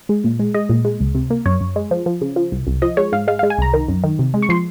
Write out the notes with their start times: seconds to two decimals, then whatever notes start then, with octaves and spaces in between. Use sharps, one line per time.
0.09 G#3
0.24 A#2
0.39 G#3
0.54 G#3 D#5
0.69 A#2
0.85 G#3
1.00 C#2
1.15 C3
1.30 A#3
1.46 F#2 C#5
1.61 F#2
1.76 G#3
1.91 F3
2.06 F3
2.21 C#3
2.36 F3
2.52 C2
2.67 C2
2.82 F3 D#5
2.97 G#3 C#5
3.12 G#2 F5
3.28 G#3 F5
3.39 F5
3.43 G#3
3.50 G#5
3.58 C2 A#5
3.73 D#3
3.88 F#2
4.04 D#3
4.19 C3
4.34 G#3
4.42 C#6
4.49 F3 C6